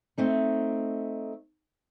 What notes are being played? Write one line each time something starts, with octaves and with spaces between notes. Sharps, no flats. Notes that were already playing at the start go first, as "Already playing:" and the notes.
A3 C4 D#4